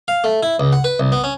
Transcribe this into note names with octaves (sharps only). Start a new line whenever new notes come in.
F5
A3
E4
C#2
F#5
B4
C2
B3
C#4